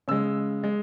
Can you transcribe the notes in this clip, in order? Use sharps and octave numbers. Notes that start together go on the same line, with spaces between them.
C#3 G#3 E6
G#3